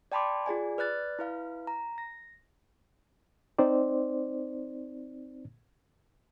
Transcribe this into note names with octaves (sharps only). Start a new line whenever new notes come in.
D5 G5 A5 B5 C6 D6
F4 G#4 D5 G#5
B4 D5 F#6 A6
E4 B4 F5
A#5
A#6
C4 D#4 C5 D5